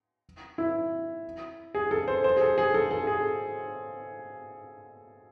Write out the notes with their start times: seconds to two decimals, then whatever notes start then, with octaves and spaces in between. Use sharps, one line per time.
0.58 E4
1.75 G#4
1.91 A4
2.08 C5
2.24 C5
2.37 G#4
2.41 A4
2.58 G#4
2.74 A4
2.91 A4
3.07 G#4